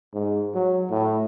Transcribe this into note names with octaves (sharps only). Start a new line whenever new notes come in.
G#2
F#3
A2